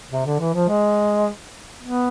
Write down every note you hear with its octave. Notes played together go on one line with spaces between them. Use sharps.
C3
D3
E3
F3
G#3
B3